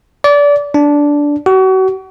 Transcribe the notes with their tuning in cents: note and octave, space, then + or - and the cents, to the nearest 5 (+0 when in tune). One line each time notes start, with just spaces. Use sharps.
D5 -25
D4 -10
F#4 +35